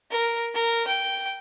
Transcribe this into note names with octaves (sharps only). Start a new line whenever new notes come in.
A#4
A#4
G5